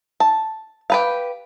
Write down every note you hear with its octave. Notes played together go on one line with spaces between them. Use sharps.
A5
G4 B4 F5